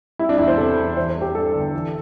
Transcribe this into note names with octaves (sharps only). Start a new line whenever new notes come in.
G3 E4
D4
E2 E4
C5
C3 A4
E2
E3 C5
C5
G3
G4
G2 A4
G1
E3